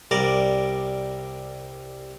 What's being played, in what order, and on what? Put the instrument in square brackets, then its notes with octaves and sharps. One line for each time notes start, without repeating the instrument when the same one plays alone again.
[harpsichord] C2 G3 A#4 D5 D6